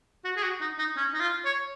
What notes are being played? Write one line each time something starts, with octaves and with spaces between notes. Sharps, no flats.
F#4
G#4
F#4
D#4
D#4
C#4
D#4
F4
C#5